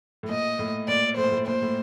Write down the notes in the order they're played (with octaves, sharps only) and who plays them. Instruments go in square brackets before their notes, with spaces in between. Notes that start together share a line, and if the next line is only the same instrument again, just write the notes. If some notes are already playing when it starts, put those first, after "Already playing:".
[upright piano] A2
[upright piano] A#2 [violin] D#5
[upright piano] A2
[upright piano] A#2 [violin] D5
[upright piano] A2 [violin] C5
[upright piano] A#2
A2
[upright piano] A#2 [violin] C5
[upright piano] A2